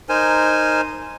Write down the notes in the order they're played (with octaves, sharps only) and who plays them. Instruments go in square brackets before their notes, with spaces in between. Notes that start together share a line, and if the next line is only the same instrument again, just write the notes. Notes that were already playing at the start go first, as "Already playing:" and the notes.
[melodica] D#4 A#4 C5 G#5